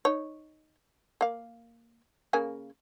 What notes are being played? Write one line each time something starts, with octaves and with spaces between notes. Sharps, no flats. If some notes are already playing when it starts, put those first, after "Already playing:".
D#4 C#5
A#3 F5
C#3 A#3 G#5